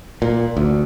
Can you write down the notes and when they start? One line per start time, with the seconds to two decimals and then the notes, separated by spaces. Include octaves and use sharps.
0.22 A#2
0.57 D2